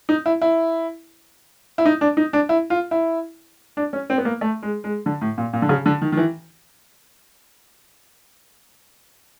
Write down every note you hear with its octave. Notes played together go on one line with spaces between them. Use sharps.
D#4
E4
E4
E4
D#4
D4
D#4
D4
E4
F4
E4
D4
C#4
C4
B3
A#3
A3
G#3
G#3
D3
A2
A#2
A#2
D3
C#3
D3
D#3
D#3
E3